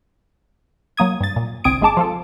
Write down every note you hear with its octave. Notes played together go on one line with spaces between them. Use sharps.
F#3 A#3 D#6 G#6
G2 A6
A#2
G1 C2 C4 D#6 G#6 D7
G1 G#3 G#4 A5 D6
F3 F4 A4